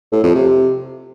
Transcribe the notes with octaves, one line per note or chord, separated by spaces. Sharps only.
A2
F2
C3